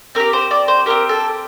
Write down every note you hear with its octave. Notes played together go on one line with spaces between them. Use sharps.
C4 G4 A#4
C5
D5
C5
C4 G4 A#4
A4